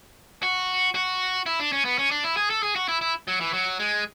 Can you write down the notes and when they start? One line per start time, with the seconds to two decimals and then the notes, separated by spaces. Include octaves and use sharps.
0.43 F#4
0.95 F#4
1.46 E4
1.60 D4
1.72 C#4
1.85 B3
1.98 C#4
2.11 D4
2.24 E4
2.37 G#4
2.50 A4
2.63 G#4
2.76 F#4
2.88 E4
3.01 E4
3.28 F#3
3.41 E3
3.53 F#3
3.79 G#3